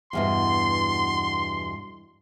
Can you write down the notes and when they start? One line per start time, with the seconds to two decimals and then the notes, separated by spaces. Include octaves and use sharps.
0.13 E2 G2 B2 C6